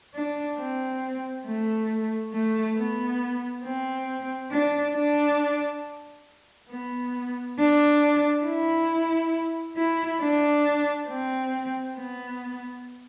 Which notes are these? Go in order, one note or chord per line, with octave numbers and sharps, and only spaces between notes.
D4
C4
A3
A3
B3
C4
D4
D4
B3
D4
E4
E4
D4
C4
B3